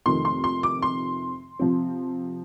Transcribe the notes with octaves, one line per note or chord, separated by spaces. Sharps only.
F2 C3 D#3 A3 C6
C6
C6
D6
C6
C3 F3 C4